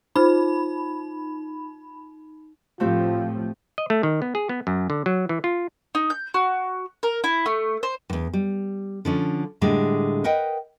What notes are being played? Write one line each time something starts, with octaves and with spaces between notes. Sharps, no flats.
D#4 F4 C5 B5
A2 F3 A3 C4 F4 G4
D#5
A3
D#3
B3
G#4
B3
F#2
D3
F#3
E3
F4
D#4
G6
F#4
A#4
E4
A3
C5
E2 G#2
G3
D3 F3 C#4
A2 D3 G3 G#3
A#4 B4 D#5 F#5 G5